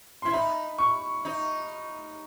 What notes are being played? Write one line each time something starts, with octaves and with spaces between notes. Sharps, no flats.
E4 C6
D#4 B5
C#6
D#4